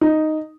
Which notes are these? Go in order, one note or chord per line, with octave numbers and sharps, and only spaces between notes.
D#4